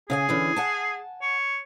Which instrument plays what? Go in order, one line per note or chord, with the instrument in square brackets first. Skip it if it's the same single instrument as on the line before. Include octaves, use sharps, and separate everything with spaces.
[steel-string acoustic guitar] C#3 F5 G#5 [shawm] G#4
[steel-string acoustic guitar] D3 E3 C#4
F#5 G#5 A5
[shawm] C#5